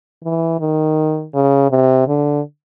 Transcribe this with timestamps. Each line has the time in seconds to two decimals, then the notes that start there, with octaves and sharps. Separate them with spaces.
0.24 E3
0.60 D#3
1.34 C#3
1.70 C3
2.08 D3